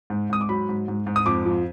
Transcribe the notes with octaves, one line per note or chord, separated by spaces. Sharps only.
G#2
G#2 D#6
D6
F#3 B5
G#2
G#2
G#2
D#6
F2 D6
F3